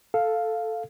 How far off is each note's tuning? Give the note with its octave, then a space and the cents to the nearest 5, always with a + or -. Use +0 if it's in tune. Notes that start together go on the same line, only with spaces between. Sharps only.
A4 +0 F5 +0